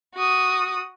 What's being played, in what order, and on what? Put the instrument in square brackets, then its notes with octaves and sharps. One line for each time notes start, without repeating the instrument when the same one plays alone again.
[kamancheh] F#4 D#6